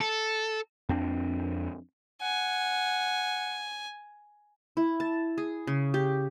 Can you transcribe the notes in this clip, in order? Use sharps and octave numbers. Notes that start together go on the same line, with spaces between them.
A4
F2 C4 D4
F#5 G#5
E4
A5
G#4
C#3
G4